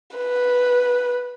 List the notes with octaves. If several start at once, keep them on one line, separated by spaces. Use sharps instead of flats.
B4